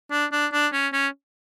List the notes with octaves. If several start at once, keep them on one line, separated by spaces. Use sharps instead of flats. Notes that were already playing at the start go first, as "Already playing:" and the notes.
D4
D4
D4
C#4
C#4